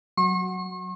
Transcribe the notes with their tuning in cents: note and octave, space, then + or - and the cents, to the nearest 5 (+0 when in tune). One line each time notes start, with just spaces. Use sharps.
F#3 +0 C#6 -45